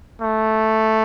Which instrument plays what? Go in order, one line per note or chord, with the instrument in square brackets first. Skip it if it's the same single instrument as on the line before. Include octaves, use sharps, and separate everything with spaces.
[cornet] A3